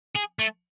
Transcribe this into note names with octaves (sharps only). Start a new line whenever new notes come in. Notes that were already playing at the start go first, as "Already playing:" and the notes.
G#4
A3